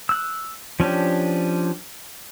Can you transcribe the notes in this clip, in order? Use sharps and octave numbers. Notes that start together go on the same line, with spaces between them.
E6 F#6
F3 C#4 D4 G4